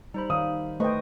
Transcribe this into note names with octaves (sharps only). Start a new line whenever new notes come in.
G3 D#4 C5 B5
D#3 F5 D#6
A3 B4 C5 D#5 G5 C#6